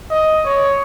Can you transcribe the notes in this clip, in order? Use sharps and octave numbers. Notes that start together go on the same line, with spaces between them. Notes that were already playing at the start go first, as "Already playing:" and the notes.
D#5
C#5